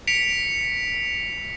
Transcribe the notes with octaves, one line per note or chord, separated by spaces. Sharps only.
B6 C#7 D7 F7